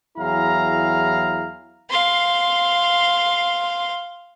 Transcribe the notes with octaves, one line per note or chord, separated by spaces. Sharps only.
E2 F#3 E4 G#4 F5 A#5
F5 C6